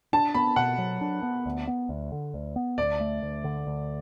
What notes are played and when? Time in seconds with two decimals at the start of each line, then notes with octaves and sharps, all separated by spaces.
0.13 D4 A5
0.35 B3 B5
0.56 B2 F#5
0.78 F#3
1.01 D4
1.23 B3
1.46 D2
1.67 B3
1.89 D2
2.12 D3
2.34 D2
2.56 B3
2.78 D2 D5
3.00 A3
3.23 D2
3.44 D3
3.67 D2